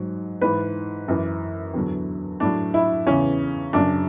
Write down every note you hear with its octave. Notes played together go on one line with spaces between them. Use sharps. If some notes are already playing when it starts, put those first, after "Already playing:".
Already playing: G#2 F#3
G#2 E3 B4
F#2 E3
E2 D3 F#3
A2 D4
F#3
E4
E2 C#3 E3 C#4
F#2 C#3 F#3 D4